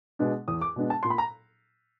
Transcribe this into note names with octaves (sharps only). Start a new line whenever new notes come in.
B2 G#3 B3 D4
E2 D#6
D6
B2 G#3 B3 D4
A5
A#2 C6
B5
A#5